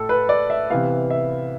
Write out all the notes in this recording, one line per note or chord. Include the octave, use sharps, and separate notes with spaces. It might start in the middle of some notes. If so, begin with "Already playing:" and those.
Already playing: A2 A4
B4
D5
E5
C3 E3 B3 F5
E5